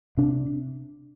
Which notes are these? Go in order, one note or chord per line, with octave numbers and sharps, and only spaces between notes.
C3 D4